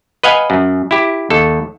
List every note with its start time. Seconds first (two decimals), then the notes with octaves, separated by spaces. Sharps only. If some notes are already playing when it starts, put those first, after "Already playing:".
0.23 B4 D#5 F5 F#5 G#5
0.50 F#2
0.91 E4 G4
1.30 D#2 A4